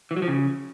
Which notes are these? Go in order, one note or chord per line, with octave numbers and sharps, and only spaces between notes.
E3
F#3
F3
C#3